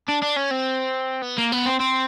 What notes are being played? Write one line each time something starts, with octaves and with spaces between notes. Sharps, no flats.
D4
D4
C#4
C4
B3
A#3
B3
C4
C4